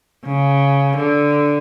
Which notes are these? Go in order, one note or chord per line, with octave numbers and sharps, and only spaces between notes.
C#3
D3